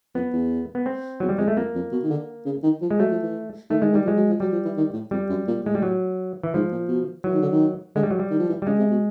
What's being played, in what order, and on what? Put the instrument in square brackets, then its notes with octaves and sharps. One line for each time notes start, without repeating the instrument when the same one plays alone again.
[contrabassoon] F2 [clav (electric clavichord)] B3
[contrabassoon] E2
[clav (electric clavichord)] B3
C4
[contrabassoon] E2 [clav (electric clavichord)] F#3
[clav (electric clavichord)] G3
[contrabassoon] F2 [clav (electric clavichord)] G#3
[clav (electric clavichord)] A3
[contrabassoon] F2 [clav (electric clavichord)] A#3
[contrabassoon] F2
B2
D#3
D3
C#3
D#3
F3
[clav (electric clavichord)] G#3
[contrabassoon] F#3 [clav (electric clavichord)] A3
[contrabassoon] F3
E3
[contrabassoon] D#3 [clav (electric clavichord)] A3
[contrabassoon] D#3 [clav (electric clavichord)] G#3
[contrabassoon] D#3 [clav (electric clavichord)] G3
[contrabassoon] F3
[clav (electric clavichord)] G#3
[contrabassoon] F#3
F3
[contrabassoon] F#3 [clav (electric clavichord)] G3
[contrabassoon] F3
E3
D#3
A2
[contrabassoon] F2 [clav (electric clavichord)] G3
[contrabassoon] F#2
A#2
[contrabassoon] A2 [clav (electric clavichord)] G#3
[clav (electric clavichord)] G3
F#3
E3
[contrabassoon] G#2 [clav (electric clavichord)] F3
[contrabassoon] A#2
B2
[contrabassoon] E3 [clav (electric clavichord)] F#3
[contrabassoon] D#3
D3
D#3
[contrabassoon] D3 [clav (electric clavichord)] G#3
[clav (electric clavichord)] G3
F#3
G3
[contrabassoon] D#3
F3
E3
[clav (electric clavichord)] G3
[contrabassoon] C#3 [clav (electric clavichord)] G#3
[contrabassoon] C3
B2